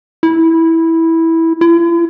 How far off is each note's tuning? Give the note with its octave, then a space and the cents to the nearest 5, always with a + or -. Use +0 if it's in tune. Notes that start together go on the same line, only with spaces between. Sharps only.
E4 -10
E4 +45